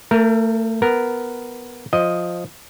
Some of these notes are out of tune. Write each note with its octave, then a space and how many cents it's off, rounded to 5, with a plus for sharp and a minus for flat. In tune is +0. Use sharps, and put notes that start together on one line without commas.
A3 +30 A#4 +0
B3 +0 A#4 +0
F3 +5 D#5 +0